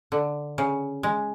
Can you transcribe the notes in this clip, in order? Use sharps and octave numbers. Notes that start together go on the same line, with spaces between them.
D3
C#3
G#3